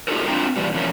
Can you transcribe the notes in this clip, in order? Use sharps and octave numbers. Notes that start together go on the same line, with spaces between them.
D#4 F4 G4 A4 A#4
C4 D4 F4 G5 A#5
A#2 E3 G3
B2 E3 F3 G#3 C#4 A#4